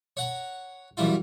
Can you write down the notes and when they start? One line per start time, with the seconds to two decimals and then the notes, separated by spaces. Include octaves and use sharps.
0.17 C#5 F#5 A#5
0.97 F#2 E3 G3 E4 F4